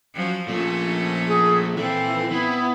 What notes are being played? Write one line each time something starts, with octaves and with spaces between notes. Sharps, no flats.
F3 F#3 C#4
A#2 F3 A3 C#4
G#4
A#2 E3 C4 A4
B3 E4